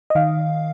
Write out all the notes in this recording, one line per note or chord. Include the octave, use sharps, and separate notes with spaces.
D#5
D#3 F5